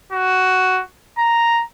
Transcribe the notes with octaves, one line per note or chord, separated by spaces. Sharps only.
F#4
A#5